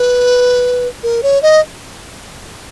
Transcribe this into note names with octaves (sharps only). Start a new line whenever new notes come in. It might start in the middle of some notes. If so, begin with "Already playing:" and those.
Already playing: B4
A#4
C#5
D#5